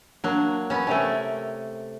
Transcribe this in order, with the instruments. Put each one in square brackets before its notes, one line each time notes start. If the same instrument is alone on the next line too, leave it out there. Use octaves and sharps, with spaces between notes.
[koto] F#3 A#3 [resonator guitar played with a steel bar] D4
[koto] B3 C#4
[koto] C3 A3 [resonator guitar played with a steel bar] A#4 C#5 G#5